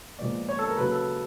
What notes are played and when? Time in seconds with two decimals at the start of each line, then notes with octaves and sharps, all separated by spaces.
0.19 A#2 F3 G#3 B3 D5
0.49 C#5
0.59 A4
0.67 A#4
0.77 C#3 F#3 A#3 B4
0.91 A4